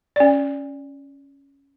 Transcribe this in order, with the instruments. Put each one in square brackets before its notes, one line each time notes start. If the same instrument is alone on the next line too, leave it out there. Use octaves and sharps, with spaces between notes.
[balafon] C#4 D5